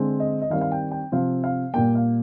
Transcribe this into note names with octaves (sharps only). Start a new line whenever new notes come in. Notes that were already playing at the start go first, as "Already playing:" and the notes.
Already playing: D3 G#3 C4
D#5
D#5
D#3 G3 C4 F5
F5
G5
G5
C3 F3 C4 F5
F5
A#2 G3 A#3 G5
F5